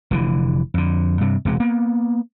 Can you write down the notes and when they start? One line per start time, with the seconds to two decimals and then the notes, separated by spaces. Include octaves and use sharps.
0.11 F1 D3 E3
0.74 F2 D3
1.21 G2 C3
1.45 E1 C3 G#3
1.60 A#3 B3